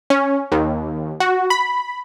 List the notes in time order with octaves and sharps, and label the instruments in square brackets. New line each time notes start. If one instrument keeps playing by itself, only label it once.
[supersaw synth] C#4
D#2
F#4
B5